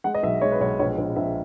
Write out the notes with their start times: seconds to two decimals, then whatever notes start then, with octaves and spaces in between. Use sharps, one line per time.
0.04 G#3 F#5
0.14 D#5
0.23 B1 E5
0.42 G#3 C#5
0.52 B4
0.60 B1 C#5
0.80 A#1 C#5
0.98 A#1
1.16 A#1 E5